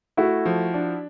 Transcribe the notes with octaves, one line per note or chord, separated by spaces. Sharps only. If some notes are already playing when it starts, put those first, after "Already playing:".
A3 E4 F#4
F3
D4